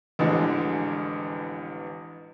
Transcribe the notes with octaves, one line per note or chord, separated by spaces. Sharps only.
A1 E2 D3 F3 G#3